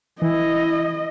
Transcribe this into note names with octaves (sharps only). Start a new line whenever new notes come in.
E3 E4 D#5